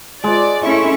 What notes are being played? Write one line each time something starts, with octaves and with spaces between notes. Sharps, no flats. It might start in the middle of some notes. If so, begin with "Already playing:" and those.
G#3 D5
A3 C#4 E4 C#6